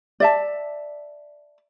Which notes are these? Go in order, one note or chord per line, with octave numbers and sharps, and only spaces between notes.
D5 E5 A5